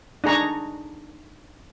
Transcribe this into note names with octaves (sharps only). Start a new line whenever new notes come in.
D4 D#4 G#4 A#5 C#6